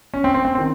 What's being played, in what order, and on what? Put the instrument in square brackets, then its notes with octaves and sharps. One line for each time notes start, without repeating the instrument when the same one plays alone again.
[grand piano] C#4
C4
C4
C4
C4
D#3